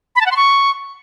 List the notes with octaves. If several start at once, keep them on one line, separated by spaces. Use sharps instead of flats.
B5
A5
F#5
C6
C#6